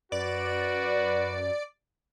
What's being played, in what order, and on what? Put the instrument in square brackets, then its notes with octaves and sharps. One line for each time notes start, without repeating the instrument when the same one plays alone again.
[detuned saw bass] F#2 [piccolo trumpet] F#4 [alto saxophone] B4 [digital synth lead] D5